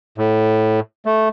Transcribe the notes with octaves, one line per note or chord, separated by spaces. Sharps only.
A2
A3